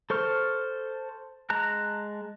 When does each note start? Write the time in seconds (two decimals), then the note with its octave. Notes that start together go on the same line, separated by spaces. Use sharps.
0.10 A4 C5 C#6 F6
1.50 G#3 A5 A#5 F#6